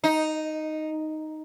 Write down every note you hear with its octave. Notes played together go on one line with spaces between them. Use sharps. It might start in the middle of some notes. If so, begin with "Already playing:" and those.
D#4